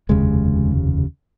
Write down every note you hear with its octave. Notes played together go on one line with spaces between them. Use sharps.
F1 D#2 C#3 G#3